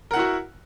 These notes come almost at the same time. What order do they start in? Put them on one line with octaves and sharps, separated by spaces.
A#4 F#5 E4 F#4